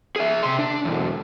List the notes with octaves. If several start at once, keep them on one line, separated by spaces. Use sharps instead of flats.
G#4 E5
C3 C6
D4
B1 E2